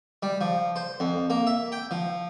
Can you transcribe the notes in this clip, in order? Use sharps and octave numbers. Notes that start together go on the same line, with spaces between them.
G3
F3
C5
F2
A#3
E5
G5
F3